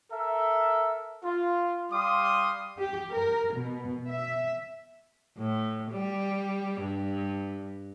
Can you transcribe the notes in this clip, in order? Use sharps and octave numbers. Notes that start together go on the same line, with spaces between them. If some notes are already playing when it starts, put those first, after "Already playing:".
A4 A#4 E5
F4
G3 F5 C6 D6 D#6
G4
A#4
B2
E5
A2
G3
G2